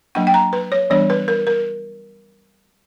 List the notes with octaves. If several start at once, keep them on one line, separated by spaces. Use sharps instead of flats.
F#3 A#3 D4 F#5
G5
A#5
B4
C#5
E3 G3 B3 D4 C#5
B4
A#4
A#4